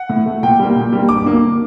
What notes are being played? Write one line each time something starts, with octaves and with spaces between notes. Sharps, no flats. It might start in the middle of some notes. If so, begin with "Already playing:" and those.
Already playing: F#5
A2
A3
A#2 G5
G3 A#3
A#2
G3 A#3
G2 D6
D3 F#3 A#3